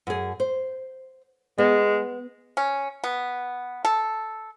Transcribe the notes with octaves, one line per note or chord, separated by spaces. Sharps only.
F#2 G#4
C5
G#3 B3
C#4
B3
A4